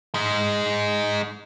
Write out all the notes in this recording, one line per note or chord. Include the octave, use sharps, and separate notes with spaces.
G#3 D#4